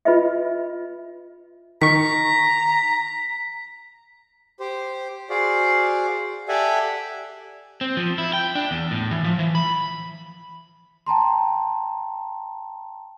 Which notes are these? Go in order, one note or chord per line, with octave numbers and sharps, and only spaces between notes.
F4 B4 D#5 E5
D#3 A#5 C#6 B6
G4 C5
F#4 G#4 C5 D5 F5
G4 A4 D5 E5 F#5 G#5
C4
F3
E4
G5
D4
E2
A2
E3
F3
E3
B5
G5 A5 A#5 C6